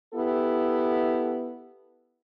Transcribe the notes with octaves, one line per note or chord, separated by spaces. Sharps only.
B3 E4 G4 A4